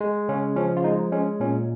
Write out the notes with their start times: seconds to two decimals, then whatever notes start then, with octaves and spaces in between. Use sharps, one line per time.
0.01 G#3
0.29 C#3 C#4
0.56 F3 C#4
0.77 F4
0.84 G#3 D#4
1.12 G#3 C#4
1.40 A#2 C#4